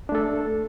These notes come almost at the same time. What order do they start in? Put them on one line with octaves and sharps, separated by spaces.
D4 A3 A4